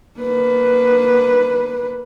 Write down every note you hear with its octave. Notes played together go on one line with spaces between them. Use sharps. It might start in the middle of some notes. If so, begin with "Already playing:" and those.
A#3 B4